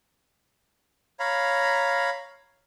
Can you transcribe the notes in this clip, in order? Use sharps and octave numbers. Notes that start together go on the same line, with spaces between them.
C#5 F5 A#5 B5